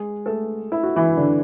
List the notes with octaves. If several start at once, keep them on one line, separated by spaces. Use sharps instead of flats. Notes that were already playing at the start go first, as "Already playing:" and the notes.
Already playing: G#3 G#4
A3 A4
E4
F#4
E3 E4
D3 D4